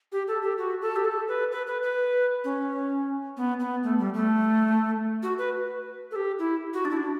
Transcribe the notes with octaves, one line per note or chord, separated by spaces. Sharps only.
G4
A4
G4
F#4
A4
G4
A4
B4
B4
B4
B4
C#4
B3
B3
A3
G3
A3
F#4
B4
A4
G4
E4
F#4
D4
E4
D4